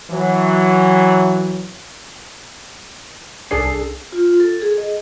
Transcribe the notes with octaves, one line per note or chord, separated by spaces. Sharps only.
E3 F#3
C2 D4 G#4 A4 C7
F4
A4
G#4
D#5